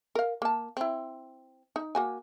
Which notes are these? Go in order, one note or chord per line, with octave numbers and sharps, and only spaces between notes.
A#4 F5
A#3 A5
C4 E4
D#4
A#3 F#4 G#5